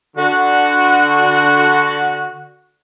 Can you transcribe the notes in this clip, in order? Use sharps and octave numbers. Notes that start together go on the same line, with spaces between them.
D3 F#4